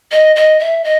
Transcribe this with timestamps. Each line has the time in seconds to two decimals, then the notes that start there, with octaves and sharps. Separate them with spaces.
0.12 D#5
0.36 D#5
0.59 E5
0.84 D#5